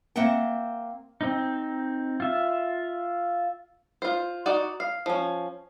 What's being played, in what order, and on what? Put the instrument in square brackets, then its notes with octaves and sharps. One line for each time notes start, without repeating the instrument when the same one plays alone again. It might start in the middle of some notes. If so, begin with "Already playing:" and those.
[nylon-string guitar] A#3 C4 E5 F#5 G5
[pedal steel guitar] C4 D#4
F4 E5
[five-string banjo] F4 C5
D#4 F#4 D5
F5
F3 C#4